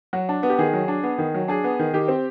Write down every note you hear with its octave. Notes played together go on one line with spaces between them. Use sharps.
F#3 F#4
D4
B3
G4
D#3 G#4
F#3
D4
B3
D#3
F#3
D4 G#4
B3
D#3
D#3 G4
C4